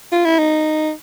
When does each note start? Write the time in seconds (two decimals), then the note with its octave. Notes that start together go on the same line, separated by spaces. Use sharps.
0.12 F4
0.25 E4
0.39 D#4